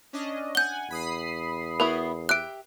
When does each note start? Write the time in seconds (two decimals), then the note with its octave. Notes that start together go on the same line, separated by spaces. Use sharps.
0.13 C#4 D4 D#5
0.55 F#5 G#5 G6 G7
0.90 E2 B5 D#6 C7
1.80 B3 E4 F#4 A#4
2.29 G4 E5 F#6 D7